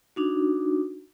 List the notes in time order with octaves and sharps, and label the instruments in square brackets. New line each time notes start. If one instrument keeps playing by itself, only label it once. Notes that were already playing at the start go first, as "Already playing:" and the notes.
[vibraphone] D4 D#4 F#4